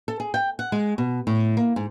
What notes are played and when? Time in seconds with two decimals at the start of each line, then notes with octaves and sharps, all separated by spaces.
0.08 A4
0.20 G#4
0.34 G5
0.59 F#5
0.72 G#3
0.98 B2
1.27 A2
1.57 A#3
1.76 G#2